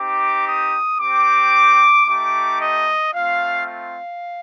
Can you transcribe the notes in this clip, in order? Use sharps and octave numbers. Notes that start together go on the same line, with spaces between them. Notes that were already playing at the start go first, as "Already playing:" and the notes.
Already playing: C4 D#4 G4 D6
D#6
C4 G4 D6
A3 D#4 G4 D6
D#5
A3 C4 F4 F5
F5